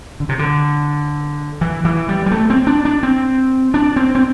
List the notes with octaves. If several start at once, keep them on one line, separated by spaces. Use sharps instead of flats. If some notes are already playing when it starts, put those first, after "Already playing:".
D3
C3
D3
E3
E3
G3
G3
A3
C4
D4
D4
C4
D4
C4
C4